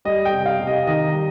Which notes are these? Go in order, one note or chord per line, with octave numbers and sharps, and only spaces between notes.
G3 D#5
G5
C3
F5
C3
D#5
D#3 D#5
G3